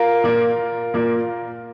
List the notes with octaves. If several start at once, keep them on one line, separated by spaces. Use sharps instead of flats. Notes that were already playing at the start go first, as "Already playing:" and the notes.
Already playing: F4 A#4
A#2 A#3
A#2 A#3